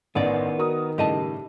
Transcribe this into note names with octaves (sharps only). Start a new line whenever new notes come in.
A1 D#3 B3 D5 D#5
F#4 A#4 D#6
A2 C#3 G3 G4 D#5 A5